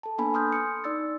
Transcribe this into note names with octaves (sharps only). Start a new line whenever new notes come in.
A4 A5
A#3 B3 D4 A4 G#5 B5
G#5 C6 D#6 F6 G6
C6 D#6 C#7
D#4 D5 E6 A6